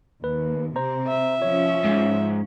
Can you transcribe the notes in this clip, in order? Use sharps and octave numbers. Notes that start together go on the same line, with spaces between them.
D#2 B4
C3 C4 C5 A#5
E5
F3 C#4 C#5
G#2